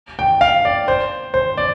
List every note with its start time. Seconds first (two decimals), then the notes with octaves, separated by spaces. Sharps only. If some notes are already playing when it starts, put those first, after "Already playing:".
0.19 G5
0.41 F5
0.65 D5
0.88 C5
1.34 C5
1.57 D5